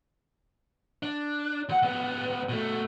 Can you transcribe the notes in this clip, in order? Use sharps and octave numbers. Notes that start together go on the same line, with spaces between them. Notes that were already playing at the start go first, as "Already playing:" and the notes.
D4
D2 F#5
C#2 B3
B2 A3